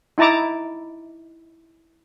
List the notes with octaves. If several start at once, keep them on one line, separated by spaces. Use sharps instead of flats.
D#4 E4 A5 A#5 D6